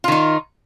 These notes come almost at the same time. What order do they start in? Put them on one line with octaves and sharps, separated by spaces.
F4 D#3 D#4